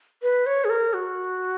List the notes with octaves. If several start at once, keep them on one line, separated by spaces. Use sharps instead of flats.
B4
C#5
G#4
A#4
F#4